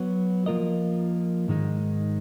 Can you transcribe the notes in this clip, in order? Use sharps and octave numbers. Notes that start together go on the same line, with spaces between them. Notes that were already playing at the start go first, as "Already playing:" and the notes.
Already playing: F#3 B3 F#4
F3 A#3 F4 A#4 D#5
G#2 D#3 G#3 D#4